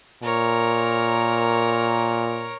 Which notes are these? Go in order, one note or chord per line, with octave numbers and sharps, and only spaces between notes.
A#2 A#4 C#5